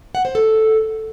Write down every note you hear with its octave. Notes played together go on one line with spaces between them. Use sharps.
F#5
C5
A4